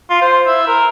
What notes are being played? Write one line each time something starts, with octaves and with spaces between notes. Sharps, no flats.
F4
C5
E4
A#4